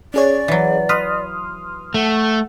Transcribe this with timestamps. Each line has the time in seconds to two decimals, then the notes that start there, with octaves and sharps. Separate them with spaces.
0.14 C#4 G#4 C#5 D5
0.48 E3 F#3
0.89 B4 C6 D#6 F6
1.94 A3 F#5